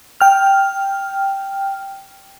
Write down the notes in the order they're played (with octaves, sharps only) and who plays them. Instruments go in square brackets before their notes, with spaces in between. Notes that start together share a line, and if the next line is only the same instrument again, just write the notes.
[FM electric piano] G5 F6